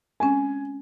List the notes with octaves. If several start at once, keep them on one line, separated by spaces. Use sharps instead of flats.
G#3 C4 C#4 G#5